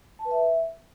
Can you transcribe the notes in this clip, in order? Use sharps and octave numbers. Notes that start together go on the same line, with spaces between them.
A5
B4
E5